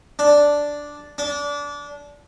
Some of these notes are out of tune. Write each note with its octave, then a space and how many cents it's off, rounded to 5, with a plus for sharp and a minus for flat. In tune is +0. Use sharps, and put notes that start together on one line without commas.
D4 -5
D4 -25